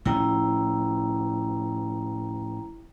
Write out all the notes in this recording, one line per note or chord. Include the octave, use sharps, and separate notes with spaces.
A2 F3 C#4 E4 G5 A#5